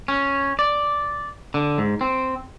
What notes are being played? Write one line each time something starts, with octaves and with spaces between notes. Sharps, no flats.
C#4
D5
D3
G#2
C4